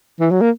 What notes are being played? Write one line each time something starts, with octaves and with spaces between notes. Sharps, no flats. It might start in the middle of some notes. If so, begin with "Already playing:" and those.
E3
F#3
A#3